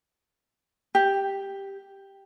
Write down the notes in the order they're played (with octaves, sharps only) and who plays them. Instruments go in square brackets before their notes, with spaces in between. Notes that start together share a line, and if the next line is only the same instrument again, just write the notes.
[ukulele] G4